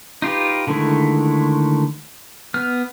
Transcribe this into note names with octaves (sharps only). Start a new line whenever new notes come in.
D#4 F4 G4 B4
D3 D#3 G#3 A3 E4
B3 F6